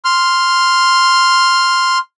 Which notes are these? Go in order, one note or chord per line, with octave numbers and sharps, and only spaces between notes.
C6 F6